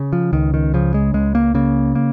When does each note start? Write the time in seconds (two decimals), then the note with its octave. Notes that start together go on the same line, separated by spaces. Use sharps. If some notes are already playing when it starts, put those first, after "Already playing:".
Already playing: C#3
0.13 F3
0.33 C#2 D#3
0.54 D#3
0.74 C#3 F3
0.94 G#3
1.14 C#2 G#3
1.35 A#3
1.55 C#3 A#3
1.95 A#3